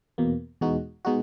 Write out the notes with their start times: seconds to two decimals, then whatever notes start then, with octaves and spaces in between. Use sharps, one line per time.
0.18 E2 B2 A#3
0.61 E2 B2 G#3 D#4 F#4
1.05 B2 G#3 D#4 F#4